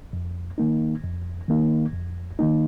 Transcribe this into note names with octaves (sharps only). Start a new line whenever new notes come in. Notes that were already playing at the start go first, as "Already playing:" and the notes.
F2
D#3 A#3 D#4
F2
D#3 A#3 D#4
F2
D#3 A#3 D#4